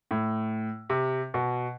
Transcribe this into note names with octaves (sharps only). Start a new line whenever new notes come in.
A2
C3
B2